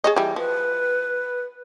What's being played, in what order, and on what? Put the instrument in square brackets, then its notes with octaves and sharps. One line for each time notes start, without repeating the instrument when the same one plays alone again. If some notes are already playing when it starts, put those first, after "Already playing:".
[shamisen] G#4 C#5 D#5
E3 G3
[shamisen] F3 [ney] B4